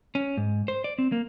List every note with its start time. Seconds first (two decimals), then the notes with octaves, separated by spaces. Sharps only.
0.15 C#4
0.37 G#2
0.68 C5
0.84 D5
0.99 C4
1.12 A#3